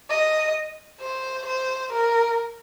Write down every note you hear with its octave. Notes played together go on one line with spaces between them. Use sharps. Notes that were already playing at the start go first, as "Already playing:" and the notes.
D#5
C5
C5
A#4